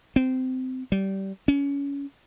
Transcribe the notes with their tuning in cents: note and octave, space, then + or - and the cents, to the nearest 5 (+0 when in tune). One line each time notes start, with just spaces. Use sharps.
C4 -20
G3 -20
C#4 +25